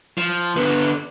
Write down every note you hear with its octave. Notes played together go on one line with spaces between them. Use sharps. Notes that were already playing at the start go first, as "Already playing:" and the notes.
F3
D3 B3